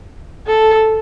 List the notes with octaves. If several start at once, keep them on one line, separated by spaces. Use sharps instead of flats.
A4